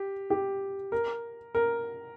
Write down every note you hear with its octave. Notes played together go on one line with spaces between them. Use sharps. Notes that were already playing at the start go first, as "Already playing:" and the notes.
Already playing: G4
G4
A#4
A#4